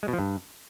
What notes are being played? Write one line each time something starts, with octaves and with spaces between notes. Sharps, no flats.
G#3
B2
F3
G2